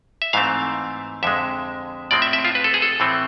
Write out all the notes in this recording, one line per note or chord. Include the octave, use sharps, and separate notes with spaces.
E5
G#2 E3 A3 C4 F5
F2 D3 G#3 E5
A2 F3 G#3 C4 D5
E5
E5
F4
B4
A4
G#4
A4
A2 E3 A3 C4